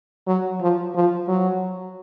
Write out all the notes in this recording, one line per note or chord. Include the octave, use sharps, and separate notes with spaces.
F#3
F3
F3
F#3